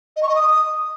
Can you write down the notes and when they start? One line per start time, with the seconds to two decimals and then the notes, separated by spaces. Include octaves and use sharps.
0.16 D#5
0.22 C#6
0.29 D#5
0.35 D#6